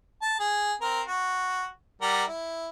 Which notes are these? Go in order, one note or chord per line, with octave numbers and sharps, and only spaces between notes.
A5
G#4
C4 A#4
F#4
G3 A#4 F#5
E4